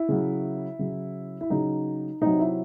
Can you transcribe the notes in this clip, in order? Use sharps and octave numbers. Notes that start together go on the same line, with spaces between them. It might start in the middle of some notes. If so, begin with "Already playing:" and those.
Already playing: E4
C#3 F#3
C#3 F#3
E4
C#3 F#3 D#4
C3 F#3 D#4
E4